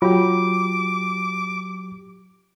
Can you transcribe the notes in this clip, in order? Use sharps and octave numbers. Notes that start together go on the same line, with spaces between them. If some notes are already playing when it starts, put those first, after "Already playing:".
F#3 F4 G4 D6